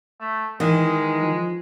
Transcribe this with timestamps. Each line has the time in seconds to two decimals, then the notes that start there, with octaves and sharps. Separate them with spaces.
0.20 A3
0.60 D#3 E3 G#3
1.22 F3